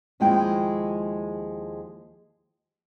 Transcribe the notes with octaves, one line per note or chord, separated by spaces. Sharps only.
D#2 F3 G#3 E4 C#5 G5